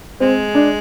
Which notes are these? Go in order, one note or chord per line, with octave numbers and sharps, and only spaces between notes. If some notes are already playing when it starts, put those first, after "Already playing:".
G#3 C4
D4